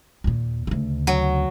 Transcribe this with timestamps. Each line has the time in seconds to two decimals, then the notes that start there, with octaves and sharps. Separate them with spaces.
0.24 D#2 A#2
0.67 D2 C#3
1.07 F#3